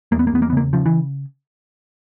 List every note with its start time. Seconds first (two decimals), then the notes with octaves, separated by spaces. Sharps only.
0.12 E2 A#3
0.19 B3
0.27 A#3
0.33 E2 B3
0.42 A#3
0.50 B3
0.53 C#3 A#3
0.73 C#3 F3
0.86 E3